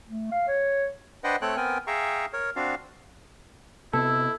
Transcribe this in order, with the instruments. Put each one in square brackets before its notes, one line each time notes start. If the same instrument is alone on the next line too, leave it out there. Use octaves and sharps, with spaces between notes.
[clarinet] A3
F5
C#5
[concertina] D4 B4 C5 D#5 F#5 G5
A3 C4 A4 C#5 G5 F#6
B3 C4 A#4 G5 G#5
G#4 E5 F5 G5 A#5 C#6
A#4 C#5
C4 D4 F#4 F5
[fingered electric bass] C3 B3 [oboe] E4 [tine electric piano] A4